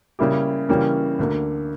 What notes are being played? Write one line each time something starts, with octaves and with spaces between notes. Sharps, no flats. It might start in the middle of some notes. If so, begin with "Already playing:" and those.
C#3 G3 A#3 E4 G4
C#3 E3 G3 A#3 C#4
D2 D3 A#3